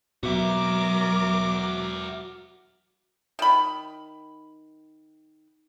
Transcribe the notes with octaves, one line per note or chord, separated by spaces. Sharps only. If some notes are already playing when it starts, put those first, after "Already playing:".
B2 F#3 F#4 A#4 E5 D6
D#3 B5